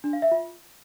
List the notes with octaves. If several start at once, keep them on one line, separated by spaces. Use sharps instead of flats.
D4
F5
E5
F4